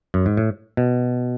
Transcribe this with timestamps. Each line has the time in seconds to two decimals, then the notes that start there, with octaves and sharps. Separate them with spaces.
0.14 F#2
0.26 G#2
0.37 A2
0.77 B2